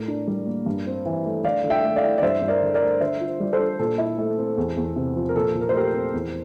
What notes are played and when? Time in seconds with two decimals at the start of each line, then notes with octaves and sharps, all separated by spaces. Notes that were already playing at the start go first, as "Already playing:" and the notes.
Already playing: A2 A#4
0.08 D4
0.27 G3
0.47 A#3
0.66 G2
0.86 C4
1.06 E3
1.25 A3
1.44 D3 D5 F5
1.64 D3
1.70 E5 G5
1.84 A3
1.96 D5 F5
2.03 E4
2.18 D5
2.22 G2 C5 E5
2.42 G2
2.48 A#4 D5
2.62 D3
2.74 A#4 D5
2.82 A3
3.01 D3 C5 E5
3.20 F4
3.40 G3
3.53 A4 C5
3.60 D4
3.79 A#2 A4
3.98 E4
4.18 A3
4.37 C4
4.58 E2
4.77 E2
4.96 C3
5.16 F3
5.29 A#4
5.36 A#2 A4
5.55 A#2
5.61 A#4
5.69 C5
5.74 A3 G4 A#4
5.94 C4
6.14 E2